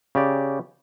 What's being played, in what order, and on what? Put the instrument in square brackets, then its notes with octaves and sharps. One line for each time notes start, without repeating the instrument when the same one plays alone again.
[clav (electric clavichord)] C#3 G4 D5